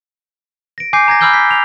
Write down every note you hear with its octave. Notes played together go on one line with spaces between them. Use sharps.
A#6 D7
G#5 D6 G6 C7
A#5 G#6 A#6
B5 D6 E6 F6 G6 G7
B6
F7